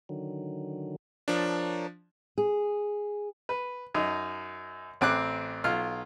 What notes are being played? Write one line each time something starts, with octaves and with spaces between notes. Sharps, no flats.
D3 D#3 F#3
F3 D4 A#4 C#5
G#4
B4
F#2 D#4
A1 C4 D6 F#6
B1 F4 F6